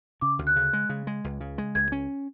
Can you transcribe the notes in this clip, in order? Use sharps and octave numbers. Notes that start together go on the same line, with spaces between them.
C#3 D6
D2
F#6
C#3
G#3
C#3
G#3
C#2
C#3
G#3
C#2 G#6
C#4